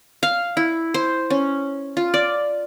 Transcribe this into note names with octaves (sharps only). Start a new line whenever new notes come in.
F5
E4
C5
C#4
F4
D5